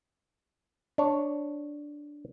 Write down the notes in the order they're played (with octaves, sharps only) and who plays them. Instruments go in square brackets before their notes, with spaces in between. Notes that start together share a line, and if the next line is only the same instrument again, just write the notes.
[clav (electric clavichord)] D4 C#5